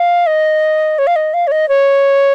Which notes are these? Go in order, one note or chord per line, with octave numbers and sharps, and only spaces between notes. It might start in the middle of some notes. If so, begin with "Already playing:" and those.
Already playing: F5
D#5
C#5
F5
D#5
F5
C#5
D#5
C#5